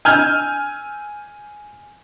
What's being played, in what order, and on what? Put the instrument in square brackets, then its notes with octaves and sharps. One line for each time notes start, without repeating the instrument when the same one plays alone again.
[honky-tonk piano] G#5 E6 F6 G6 G#6